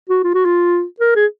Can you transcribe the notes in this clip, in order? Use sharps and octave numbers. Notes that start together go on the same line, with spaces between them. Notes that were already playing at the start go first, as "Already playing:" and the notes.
F#4
F4
F#4
F4
A#4
G#4